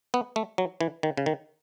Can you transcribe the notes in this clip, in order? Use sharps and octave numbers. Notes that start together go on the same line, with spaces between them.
B3
A3
F#3
E3
D#3
C#3
D#3